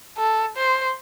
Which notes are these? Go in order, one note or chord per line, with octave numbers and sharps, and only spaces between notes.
A4
C5